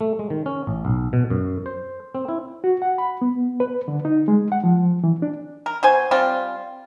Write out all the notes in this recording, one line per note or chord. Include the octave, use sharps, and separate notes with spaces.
A3
G#3
D#3
C#4
A1
B1
B2
F#2
C5
C4
E4
F#4
F#5
B5
B3
B4
D3
D#4
G#3
F#5
F3
E3
D4
A#4
B2 C5 G#5
G3 C4 F4